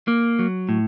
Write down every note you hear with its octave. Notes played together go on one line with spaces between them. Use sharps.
A#3
F#3
A2